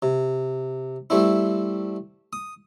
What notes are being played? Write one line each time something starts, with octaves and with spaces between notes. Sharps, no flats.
C3
G3 A3 C4 E4
D#6